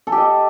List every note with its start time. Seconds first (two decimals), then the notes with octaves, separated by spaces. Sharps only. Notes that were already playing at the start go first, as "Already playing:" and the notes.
0.07 A4
0.12 G4
0.17 D#5